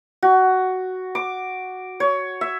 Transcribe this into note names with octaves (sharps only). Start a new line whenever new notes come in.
F#4
D6
C#5
E5